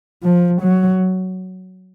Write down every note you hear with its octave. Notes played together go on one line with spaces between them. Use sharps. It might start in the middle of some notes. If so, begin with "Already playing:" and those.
F3
F#3